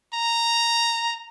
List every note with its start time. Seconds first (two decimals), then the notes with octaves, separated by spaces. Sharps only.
0.14 A#5